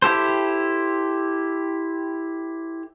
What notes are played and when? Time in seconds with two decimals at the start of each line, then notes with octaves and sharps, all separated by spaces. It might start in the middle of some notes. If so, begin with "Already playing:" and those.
0.02 E4 G4 A4 C5